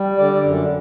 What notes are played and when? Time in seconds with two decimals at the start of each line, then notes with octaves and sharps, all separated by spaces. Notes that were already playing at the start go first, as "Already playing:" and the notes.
Already playing: G3
0.18 D3 D5
0.44 F#2